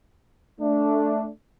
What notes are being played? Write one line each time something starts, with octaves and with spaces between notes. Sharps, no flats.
A3 D4